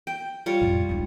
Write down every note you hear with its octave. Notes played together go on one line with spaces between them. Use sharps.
G5
G3 F4 C#5
F2 A2
C#2 D#4